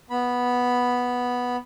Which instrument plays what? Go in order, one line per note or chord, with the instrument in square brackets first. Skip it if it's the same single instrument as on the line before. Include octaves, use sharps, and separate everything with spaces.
[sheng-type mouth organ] B3 B5